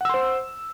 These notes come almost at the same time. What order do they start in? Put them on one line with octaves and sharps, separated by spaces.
F#5 E6 C6 C5